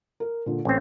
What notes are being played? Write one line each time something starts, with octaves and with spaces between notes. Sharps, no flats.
A#4
A#2 D3
A1 C4 C#4